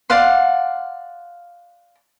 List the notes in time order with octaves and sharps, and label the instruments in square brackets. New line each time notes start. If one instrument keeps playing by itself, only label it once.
[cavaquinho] D5 F5 F#5 C6